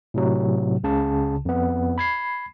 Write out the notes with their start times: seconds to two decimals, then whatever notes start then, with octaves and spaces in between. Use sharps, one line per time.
0.14 A2 C3 F#3
0.83 C#2 C#3 A5
1.45 F2 B3
1.98 B5 G#6 C7